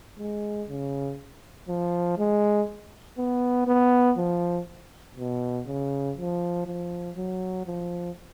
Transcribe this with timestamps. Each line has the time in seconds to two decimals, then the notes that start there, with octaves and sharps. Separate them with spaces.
0.19 G#3
0.69 C#3
1.69 F3
2.18 G#3
3.18 B3
3.67 B3
4.17 F3
5.17 B2
5.67 C#3
6.17 F3
6.66 F3
7.16 F#3
7.66 F3